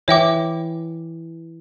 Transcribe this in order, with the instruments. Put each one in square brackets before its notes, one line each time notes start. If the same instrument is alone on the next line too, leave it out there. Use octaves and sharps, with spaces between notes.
[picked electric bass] E3 [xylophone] C#5 E5 G5 D6